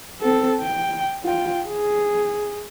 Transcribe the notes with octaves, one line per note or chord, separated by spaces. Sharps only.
C4 A4
G5
F4 G5
G#4